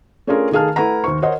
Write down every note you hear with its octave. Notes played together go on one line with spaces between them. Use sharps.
A3 C#4 D4 F4 G#4 A#4
D#3 A3 G#4 F5 A5 F6
A3 E4 B4 F#5 A#5
D#2 C5 C#6
A#4 C5 C#5 D#5 F#5